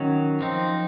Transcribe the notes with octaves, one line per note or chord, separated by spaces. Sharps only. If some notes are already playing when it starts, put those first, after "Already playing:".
Already playing: D#3 F#3 C#4
F3 C4 D#4